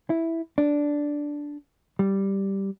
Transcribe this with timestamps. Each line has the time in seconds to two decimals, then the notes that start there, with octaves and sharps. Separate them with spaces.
0.10 E4
0.58 D4
1.99 G3